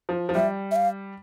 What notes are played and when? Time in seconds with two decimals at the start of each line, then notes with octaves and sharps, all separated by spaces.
0.09 F3
0.29 F3
0.35 G3 E5
0.71 E5
0.76 F5